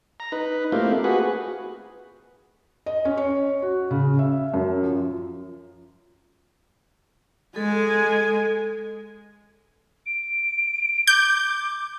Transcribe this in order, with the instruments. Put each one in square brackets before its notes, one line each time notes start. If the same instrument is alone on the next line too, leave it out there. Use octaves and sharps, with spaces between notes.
[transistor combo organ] A#5
D#4 B4
A3 A#3 C4 E4 F4 G4
F#4 G#4 B4
[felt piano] D#5
C#4
C#5
F#4
C#3
E5
F#2
F3
[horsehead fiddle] G#3 G#5 [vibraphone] A4
[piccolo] D7
[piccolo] D6 [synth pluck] G6